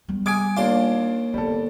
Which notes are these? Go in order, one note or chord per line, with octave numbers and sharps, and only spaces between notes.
G3 B3
G#5 D6 D#6 G#6 D7
D#2 D4 F4 C6 D6
D3 G3 B3 A4